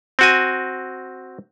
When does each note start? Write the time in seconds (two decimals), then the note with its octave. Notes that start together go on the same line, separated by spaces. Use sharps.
0.19 C4 F#4 G#5